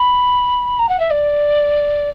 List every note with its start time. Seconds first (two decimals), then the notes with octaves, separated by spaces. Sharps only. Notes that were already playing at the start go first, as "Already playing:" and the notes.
Already playing: B5
0.79 A#5
0.89 F#5
0.99 E5
1.10 D5